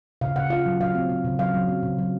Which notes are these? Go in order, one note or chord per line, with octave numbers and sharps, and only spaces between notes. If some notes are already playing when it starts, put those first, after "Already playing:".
C#3 F5
C#3 F#5
F4 F5
F#3
F#3 F5
C4
C4
C#3
F#3 F5
F#3
C4
C#3
F#3